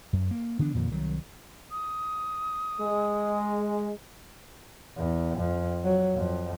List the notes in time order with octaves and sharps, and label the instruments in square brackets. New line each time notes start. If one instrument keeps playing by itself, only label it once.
[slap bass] F#2
A#3
D3 E3 B3 D4
F2 A#2 D#3
C2 D#3 F#3
[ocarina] D#6
[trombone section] G#3
[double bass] E2
F2
F#3
F2